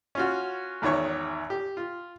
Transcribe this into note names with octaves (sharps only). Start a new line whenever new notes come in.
C#4 F4 F#4
G#1 E2 D#3 C#5 C#6
G4
F4